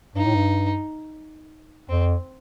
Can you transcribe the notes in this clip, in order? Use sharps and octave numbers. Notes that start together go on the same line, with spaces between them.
G2 D#4
A2
G2
F2 C4